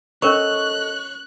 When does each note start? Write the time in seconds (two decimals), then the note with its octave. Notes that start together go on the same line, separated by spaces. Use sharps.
0.22 C#4 A4 A#4 C#5 D#5 C#6 F#6